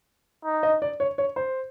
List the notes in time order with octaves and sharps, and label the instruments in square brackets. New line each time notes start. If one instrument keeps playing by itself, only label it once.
[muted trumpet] D#4
[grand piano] D#5
D5
C#5
C#5
C5